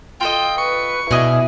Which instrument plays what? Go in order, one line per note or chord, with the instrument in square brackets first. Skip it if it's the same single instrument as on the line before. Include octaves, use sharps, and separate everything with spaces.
[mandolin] F4 A4 D#5 [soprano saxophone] G5
[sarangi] B4 [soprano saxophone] C#6
[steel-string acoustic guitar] B2 [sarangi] E4 [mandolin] G#4 D5 D#5